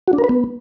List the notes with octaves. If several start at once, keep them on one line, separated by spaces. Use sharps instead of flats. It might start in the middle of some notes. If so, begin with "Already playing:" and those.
F#4
D4
A#4
B4
B3